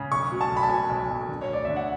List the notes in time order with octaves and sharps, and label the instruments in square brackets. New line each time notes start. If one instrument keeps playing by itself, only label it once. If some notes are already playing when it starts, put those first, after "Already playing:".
Already playing: [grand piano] C#3
B1 C#6
F#3
A5
B1
B5
A5
B2 G#5
B1
B1
D3
C#5
D2 D5
D3 E5
F#5